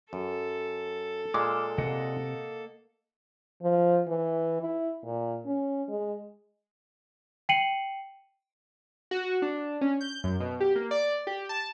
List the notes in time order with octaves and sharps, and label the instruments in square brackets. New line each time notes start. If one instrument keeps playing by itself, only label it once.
[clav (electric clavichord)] F#2 [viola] A4
[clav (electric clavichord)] A#2 G#3 [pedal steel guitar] D6 E6 F6
[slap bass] C3 [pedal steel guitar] A#3 D#5 F#5
[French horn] F3
E3
E4
A#2
C#4
G#3
[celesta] G5 C7 C#7 D#7 F#7
[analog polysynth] F#4
D4
C#4
G6
F#2
B2
G4
A#3
D5
G4
A5